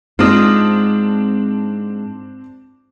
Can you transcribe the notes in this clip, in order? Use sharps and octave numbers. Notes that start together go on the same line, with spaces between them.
G#2 C4 D4 F4 D#5